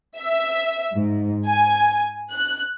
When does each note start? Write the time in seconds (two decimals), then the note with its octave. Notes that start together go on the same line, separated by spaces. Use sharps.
0.18 E5
0.94 G#2
1.46 G#5
2.32 F#6